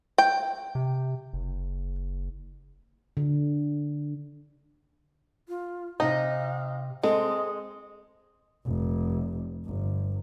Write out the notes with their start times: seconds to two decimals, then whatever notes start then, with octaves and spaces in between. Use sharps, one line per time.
0.18 G5
0.75 C3
1.33 F#1
3.17 D3
5.49 F4
6.00 C3 D#4 D#5 F5
7.03 G#3 C4 G#4 A4 D#5
8.66 F1
9.66 G1